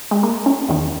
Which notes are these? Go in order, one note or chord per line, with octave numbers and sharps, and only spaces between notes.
G#3
A#3
C#4
E2 D#3